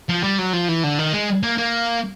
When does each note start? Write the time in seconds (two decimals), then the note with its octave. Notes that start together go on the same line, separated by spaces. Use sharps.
0.09 F3
0.23 G3
0.38 F#3
0.53 F3
0.68 E3
0.83 D3
0.98 D#3
1.13 G#3
1.43 A#3
1.58 A#3